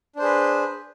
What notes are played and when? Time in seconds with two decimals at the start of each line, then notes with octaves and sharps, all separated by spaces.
0.16 D4
0.19 C5
0.22 G#4
0.25 B4